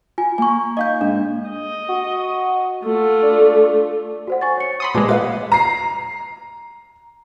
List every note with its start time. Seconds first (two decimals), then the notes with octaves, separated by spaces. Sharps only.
0.18 F4 G#5
0.38 A#3 G#5 C#6
0.77 D#4 D#5 F5 G6
1.01 G#2 D4
1.49 D#5
1.89 F#4
2.84 A3 F4
3.23 D4
4.27 F#4 C5 F#5
4.41 G#5 C#6 A6
4.57 C#5 C#7
4.80 B5 C6 D#6
4.94 A#2 G#3 G#4 B4 A5 D6
5.09 B4 D#5 F5 F#5
5.52 A#5 C7